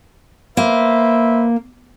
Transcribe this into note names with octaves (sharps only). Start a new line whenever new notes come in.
A#3 B4 C5 E5